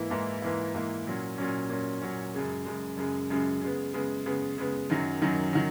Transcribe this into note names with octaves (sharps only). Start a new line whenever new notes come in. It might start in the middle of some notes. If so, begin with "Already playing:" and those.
Already playing: G#2 E3 A#3 E4
G#2 E3 A#3 E4
G#2 E3 A#3 E4
G#2 E3 A#3 E4
A#2 F#3 C#4
A#2 F#3 C#4
A#2 F#3 C#4
A#2 F#3 C#4
F#2 C#3 G#3
F#2 C#3 G#3
F#2 C#3 G#3
F#2 C#3 G#3
C#3 G#3 B3
C#3 G#3 B3
C#3 G#3 B3
C#3 G#3 B3
F#2 D#3 F#3
F#2 D#3 F#3
D#3 F#3